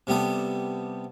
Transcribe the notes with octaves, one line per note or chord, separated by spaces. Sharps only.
C3 G3 B3 A4